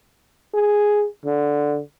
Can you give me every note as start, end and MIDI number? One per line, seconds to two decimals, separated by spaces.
0.54 1.06 68
1.25 1.80 50